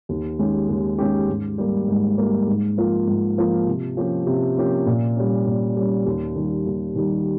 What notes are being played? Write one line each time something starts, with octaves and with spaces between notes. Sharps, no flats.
D#2
D#3 G#3 C#4 G4
D#2
D#3 G#3 C#4 G4
G#2
G3 A#3
G#2
G3 A#3
G#2
F3 A#3 F4
G#2
F3 A#3 F4
C3
F3 A#3 C#4 G4
C3
F3 A#3 C#4 G4
A#2
G3 C#4
A#2
G3 C#4
D#2
D#3 G3
D#2
D#3 G3